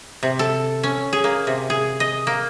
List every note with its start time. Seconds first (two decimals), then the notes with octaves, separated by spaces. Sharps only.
0.23 C3
0.39 A4
0.83 C#4
1.13 G#4
1.24 A#3
1.47 C3
1.70 G#4
2.00 D#5
2.27 A#3